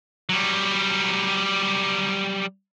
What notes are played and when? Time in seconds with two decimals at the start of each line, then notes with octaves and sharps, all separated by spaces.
0.29 F#3 G3